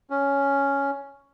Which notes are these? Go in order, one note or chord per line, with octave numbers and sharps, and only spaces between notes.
C#4